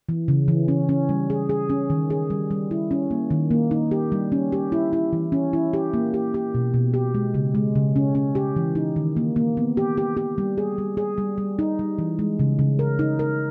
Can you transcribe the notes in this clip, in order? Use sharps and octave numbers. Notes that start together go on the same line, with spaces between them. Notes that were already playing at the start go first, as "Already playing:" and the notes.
E3
C#3
E3
C#4
C#4
G3
G#4
G#4
C#4
D#3
G#4
G3
G3
E4
C#4
A#3
D#3
A#3
D#4
G4
G3
C#4
G4
E4
E4
E3
C#4
E4
G4
A#3
G4
G4
B2
B2
G4
G#3
C#3
G#3
C#3
C#4
C#4
G4
E3
D#4
D#3
A#3
A#3
B3
G4
G4
G4
G3
G#4
G3
G#4
G3
G3
D#4
G3
E3
G#3
C#3
C#3
A#4
D#4
A#4